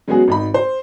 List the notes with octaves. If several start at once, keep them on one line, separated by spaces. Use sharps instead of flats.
F#3 G#3 B3 C#4 F#4 G#4
G#1 D#4 B5
C5